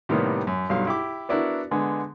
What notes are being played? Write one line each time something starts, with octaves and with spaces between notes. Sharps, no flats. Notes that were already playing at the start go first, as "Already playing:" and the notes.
A2 C3 D#3 G3 A#3 B3
F#2
B1 G2 F#3 F5
E4 G4 D6
B3 D4 E4 F#4 A#4
D3 G#3 B3